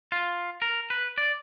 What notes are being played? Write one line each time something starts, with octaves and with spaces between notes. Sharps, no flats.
F4
A#4
B4
D5